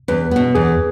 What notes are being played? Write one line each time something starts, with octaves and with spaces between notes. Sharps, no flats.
E2 B4
B2 B3
E2 G#4